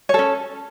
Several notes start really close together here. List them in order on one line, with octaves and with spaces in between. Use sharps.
C#5 A4 C#4